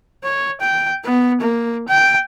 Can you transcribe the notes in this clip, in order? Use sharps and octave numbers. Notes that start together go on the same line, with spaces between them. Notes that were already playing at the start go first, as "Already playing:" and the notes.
C#5
G5
B3
A#3
G5